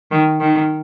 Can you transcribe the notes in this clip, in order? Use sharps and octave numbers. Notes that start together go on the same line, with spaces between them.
D#3
D#3